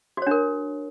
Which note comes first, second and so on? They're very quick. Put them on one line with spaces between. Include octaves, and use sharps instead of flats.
F#4 C#5 D4 A#4